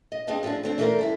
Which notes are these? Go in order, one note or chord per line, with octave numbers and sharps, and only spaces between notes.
D#5
C4 D4 G#4 D#5 F5 A5
A2 F3 C4 D4 G#4
A3 C4 D4
E3 A3 D4 E4 A#4 C5
G2 E4 A4